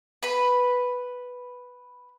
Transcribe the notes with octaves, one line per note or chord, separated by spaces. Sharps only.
B4 B5